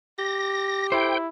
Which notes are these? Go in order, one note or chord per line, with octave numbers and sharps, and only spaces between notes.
G4 A#6
E4 A4 C5 G5